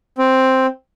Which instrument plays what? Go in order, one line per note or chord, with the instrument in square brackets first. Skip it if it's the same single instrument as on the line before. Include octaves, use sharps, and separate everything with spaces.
[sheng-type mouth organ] C4